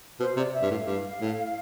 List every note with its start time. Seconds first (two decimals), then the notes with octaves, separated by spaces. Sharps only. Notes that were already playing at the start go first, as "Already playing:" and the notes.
0.20 B2 C5
0.37 C3 D5
0.53 E5
0.62 G2
0.71 A2 F5
0.87 G2
1.21 A2